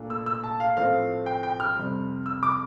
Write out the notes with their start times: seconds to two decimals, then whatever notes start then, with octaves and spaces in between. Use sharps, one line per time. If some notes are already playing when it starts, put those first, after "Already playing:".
Already playing: A#2 A3 D4
0.10 E6
0.26 E6
0.44 A5
0.60 F5
0.77 A2 F3 A3 C4 F5
1.26 G5
1.43 G5
1.60 F6
1.76 F2 C3 G3
2.26 E6
2.43 D6